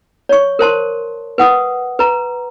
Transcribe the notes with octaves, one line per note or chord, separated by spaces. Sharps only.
C#5 C#6
A#4 C5 A5 C6
B4 F#5 D#6
B4 A#5